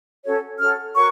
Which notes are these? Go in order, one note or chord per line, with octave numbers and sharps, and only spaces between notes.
C#4 F#4 A4 C#5
C#4 F#4 A4 C#5 F6
F#4 A#4 C#5 C#6